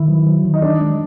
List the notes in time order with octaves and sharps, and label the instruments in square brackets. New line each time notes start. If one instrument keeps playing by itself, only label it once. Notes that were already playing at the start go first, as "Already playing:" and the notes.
Already playing: [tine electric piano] D#3 [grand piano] E4
[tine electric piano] F#3
F#3
D#3
[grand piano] D#4
[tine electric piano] E3 [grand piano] D4
[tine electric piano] G#3